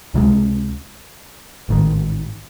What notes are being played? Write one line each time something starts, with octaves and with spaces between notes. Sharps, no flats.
C#2 C3 D#3 G#3
A1 G#2 D#3